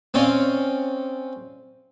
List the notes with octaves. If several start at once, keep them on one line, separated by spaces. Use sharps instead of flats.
C4 C#4 D5 D#5 F5